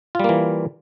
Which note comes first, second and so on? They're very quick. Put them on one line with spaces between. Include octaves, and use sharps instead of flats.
F4 G3 A#3 E3